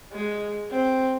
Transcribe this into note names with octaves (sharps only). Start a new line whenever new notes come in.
G#3
C4